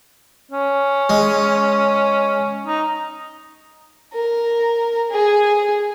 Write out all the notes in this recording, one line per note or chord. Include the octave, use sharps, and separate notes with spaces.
C#4
G#3
D#4
A#4
G#4